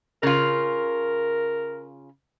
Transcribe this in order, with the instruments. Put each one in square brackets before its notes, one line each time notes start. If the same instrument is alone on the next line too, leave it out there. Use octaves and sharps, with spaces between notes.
[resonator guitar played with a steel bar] C#3 F4 [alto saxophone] A#4